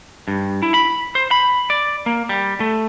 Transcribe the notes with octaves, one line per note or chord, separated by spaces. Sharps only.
G2
E4
B5
C5
B5
D5
A#3
G3
A3